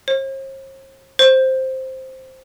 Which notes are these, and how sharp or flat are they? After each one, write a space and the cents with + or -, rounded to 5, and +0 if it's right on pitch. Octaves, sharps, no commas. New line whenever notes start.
C5 +45
C5 +5